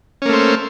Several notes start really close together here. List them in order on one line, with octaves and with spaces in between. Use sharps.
C#4 A#3 A3 C5